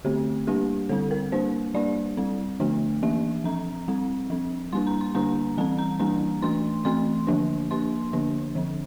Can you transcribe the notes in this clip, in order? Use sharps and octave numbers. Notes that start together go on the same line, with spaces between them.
D3 A3 C4 G4
G3 A#3 D4 G4
D3 G3 C4 A4
A#4
G3 A#3 D4 C5
G3 A#3 D4 D5
G3 C4
D3 F3 A3 D4
E3 A#3 D4 E5
F3 C4 A#5
G3 C4
F3 C4
G3 A#3 D4 C6
A#5
C6
D3 G3 A#3 D4 A#5
E3 G3 C4 A5
A#5
E3 G3 A#3 D4 A#5
E3 A3 D4 C6
E3 A3 C4 C6
D3 F3 A#3 D4
F3 A#3 D4 C6
D3 F3 A#3 D4
D3 F3 C4